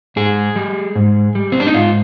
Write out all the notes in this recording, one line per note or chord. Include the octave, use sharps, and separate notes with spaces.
G#2 G#4
G3
G#2
G3
C4
D4
D#4
G#2 F4